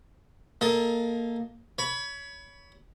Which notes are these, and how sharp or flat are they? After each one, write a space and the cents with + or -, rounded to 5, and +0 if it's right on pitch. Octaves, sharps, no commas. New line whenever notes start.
A#3 +0 A4 +0 D#5 +25
C#5 +25 B5 +0